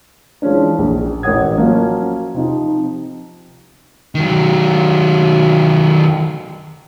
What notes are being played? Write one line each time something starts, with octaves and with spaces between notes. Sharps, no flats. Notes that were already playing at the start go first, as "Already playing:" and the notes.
E3 F3 G#3 C#4 D4
A#1
A1 A#4 C#5 F#5 D#6 G#6
F3 F#3 A#3 C#4
C3 F3 D#4
D#3 F#3